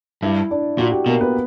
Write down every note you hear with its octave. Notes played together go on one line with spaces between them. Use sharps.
G2 E4 E5
D4 D5
A#2 F#4
G4
B2 A#3 A#4
B3 B4